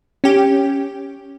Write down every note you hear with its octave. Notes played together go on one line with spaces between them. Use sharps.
C#4 G4